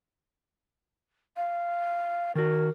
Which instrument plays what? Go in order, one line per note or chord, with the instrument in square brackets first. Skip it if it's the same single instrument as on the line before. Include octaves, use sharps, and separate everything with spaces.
[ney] F5
[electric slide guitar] D#3 F#4 [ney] A#4